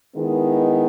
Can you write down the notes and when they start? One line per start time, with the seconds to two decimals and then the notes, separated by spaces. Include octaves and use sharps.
0.16 D#3 G#3 B3 E4